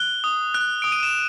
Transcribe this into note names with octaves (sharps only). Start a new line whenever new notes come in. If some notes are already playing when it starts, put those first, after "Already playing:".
Already playing: F#6 G7
D#6
F#6
D#6 D7
D#7
E7